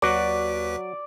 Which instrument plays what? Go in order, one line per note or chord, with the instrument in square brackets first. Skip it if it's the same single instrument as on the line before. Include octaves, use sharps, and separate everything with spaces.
[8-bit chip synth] D#2 B4 B6 [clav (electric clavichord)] F#3 F#4 [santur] D5